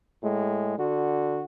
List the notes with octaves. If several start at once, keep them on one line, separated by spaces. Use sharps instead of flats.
A2 G#3
D3 F#4